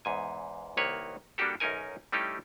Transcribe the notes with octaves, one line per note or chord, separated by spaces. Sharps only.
E2 G#2 G#5
C2 D#3 A#3 B4 C#5
G3 A#3 D4 F#4 G4 A4
B1 F#2 C#4 D#4 A#4 G#5
G3 A3 C#4 D#4 E4 G4